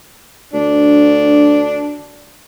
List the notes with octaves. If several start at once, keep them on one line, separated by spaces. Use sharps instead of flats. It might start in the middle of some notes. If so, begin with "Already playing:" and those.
D2 D4